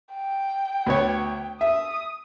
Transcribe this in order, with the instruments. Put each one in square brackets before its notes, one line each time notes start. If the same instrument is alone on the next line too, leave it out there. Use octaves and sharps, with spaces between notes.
[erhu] G5
[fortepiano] D2 B3 C#5
[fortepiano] E5 [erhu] D#6